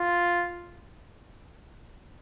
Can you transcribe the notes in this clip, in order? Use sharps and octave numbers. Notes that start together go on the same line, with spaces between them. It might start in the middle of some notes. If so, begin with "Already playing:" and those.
Already playing: F4